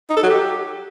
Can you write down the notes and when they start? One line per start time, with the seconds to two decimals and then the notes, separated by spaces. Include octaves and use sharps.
0.10 D#4
0.17 A4
0.23 F#3
0.30 G4